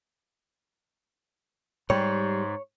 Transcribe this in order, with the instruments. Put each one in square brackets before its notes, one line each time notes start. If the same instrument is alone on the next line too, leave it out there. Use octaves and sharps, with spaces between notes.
[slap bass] G#2 [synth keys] G3 [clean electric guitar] C#5